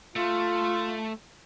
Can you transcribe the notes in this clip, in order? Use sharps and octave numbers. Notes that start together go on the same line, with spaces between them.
A3 F4